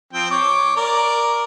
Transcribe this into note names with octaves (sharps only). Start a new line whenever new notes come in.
F3 C4 G5
C#5 D6
A#4 D5